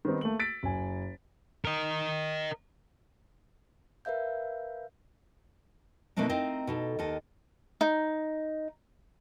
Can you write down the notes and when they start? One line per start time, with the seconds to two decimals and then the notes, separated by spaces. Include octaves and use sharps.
0.05 D#3 G3 B3 C4 D#4
0.21 A3 A#3 F#7
0.39 E6 A6 B6 D7
0.63 F#1 G#5
1.65 A#4 D#5
4.05 A#4 B4 E5 F5 G6
6.16 B2 A3 A#3 C4 D4 D#4
6.29 C4 D#4 E4 A#4 D#5 F5
6.67 B2 D#4 A4
6.99 D#2 D#3 A4 D#5
7.81 D#4